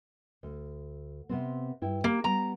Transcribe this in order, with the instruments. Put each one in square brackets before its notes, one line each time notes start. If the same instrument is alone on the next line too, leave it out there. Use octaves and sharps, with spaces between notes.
[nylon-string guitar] D2
C3 B3 C4
G2 E4 G5
[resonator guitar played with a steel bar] A#3 [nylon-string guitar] G4 A#4
[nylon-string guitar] G3 B3 [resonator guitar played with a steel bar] A#5